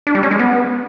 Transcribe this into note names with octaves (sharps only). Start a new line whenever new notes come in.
D4
G3
C#4
G#3
B3